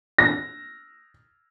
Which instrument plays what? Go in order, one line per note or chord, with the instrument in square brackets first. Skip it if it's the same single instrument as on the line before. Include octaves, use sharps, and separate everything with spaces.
[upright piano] A#6